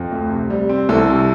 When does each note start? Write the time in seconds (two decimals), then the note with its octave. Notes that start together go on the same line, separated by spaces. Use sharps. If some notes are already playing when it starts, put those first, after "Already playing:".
Already playing: F2
0.11 D2
0.30 C3
0.50 G3
0.69 C4
0.89 C2 A4
1.09 C3